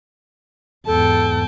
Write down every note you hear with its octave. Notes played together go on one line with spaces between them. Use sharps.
E2 G#2 A4 G5 A5